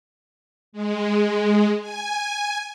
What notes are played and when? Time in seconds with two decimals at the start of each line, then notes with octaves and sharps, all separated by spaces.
0.72 G#3
1.81 G#5